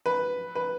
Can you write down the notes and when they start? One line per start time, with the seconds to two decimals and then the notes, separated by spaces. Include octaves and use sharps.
0.06 B4
0.55 B4